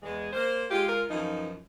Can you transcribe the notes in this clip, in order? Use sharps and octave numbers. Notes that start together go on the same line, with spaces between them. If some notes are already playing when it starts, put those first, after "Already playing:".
E2 G#3
A#3 C5
G#3 F4 G4
A#4
F#2 E3 F3 D#4